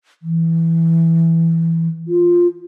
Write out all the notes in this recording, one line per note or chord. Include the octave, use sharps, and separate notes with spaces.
E3
F4